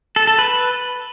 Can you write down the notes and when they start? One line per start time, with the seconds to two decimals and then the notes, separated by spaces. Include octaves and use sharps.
0.16 A4
0.27 A4
0.39 B4